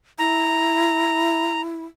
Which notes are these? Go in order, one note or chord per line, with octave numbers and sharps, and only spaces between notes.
E4 A#5